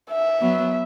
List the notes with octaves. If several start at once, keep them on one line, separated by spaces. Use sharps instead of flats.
E5
F#3 B3